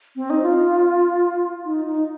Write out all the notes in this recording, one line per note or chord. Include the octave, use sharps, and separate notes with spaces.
C4
D#4
F4
D#4
D#4